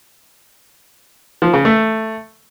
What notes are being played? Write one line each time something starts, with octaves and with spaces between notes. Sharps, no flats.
F3
C#3
A3